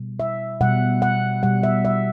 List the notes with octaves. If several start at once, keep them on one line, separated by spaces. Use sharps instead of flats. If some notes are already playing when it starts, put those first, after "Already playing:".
Already playing: B2 G3
E5
B2 G3 F#5
F#5
B2 G3 F#5
E5
E5